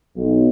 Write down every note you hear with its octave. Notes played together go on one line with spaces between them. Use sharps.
B1